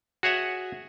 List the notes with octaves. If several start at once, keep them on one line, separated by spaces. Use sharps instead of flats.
F#4 G#4 C#5 E5 F#5